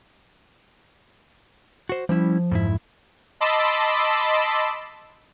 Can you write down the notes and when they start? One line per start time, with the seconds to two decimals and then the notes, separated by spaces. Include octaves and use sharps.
1.89 F#4 C5
2.09 F3 G3 C#4 E4
2.51 F2 G#2 E4
3.40 D#5 A5 B5 C6 D6 E6